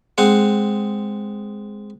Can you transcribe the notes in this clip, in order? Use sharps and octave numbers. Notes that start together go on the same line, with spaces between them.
G#3 C4 F#5